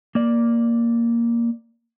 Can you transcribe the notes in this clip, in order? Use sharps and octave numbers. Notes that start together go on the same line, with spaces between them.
A#3 D5